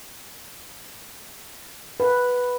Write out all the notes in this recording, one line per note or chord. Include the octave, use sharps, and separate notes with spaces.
B4